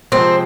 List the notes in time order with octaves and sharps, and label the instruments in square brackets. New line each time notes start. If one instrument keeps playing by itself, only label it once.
[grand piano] C3 F3 G#3 [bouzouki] C4